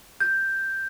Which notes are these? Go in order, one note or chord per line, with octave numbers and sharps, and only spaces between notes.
G6